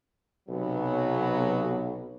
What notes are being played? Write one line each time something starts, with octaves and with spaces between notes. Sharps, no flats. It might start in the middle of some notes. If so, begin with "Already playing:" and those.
B1 C3 F#3 B3